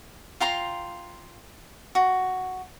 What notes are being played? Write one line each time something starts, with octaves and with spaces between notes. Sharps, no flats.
F4 G5 A#5 C6
F#4